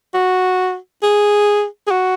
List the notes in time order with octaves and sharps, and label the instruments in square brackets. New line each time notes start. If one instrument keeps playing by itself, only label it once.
[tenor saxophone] F#4
G#4
G#4
F#4